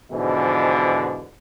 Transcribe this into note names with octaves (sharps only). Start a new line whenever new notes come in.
G#2 B2 D3 E3 F3